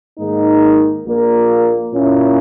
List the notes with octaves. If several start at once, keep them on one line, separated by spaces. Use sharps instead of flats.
G#2 D#3 A#3 D#4
A#1 A#2 A#3
A#2 A#3 C#4 E4